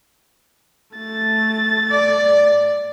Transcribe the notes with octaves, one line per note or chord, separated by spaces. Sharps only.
A3 A6
D5